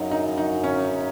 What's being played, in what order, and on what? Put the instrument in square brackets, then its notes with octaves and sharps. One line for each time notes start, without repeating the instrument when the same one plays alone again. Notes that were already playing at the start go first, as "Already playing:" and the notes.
Already playing: [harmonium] F#2 C#3 F#3 [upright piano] D#4
[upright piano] D#4
D#4
C#4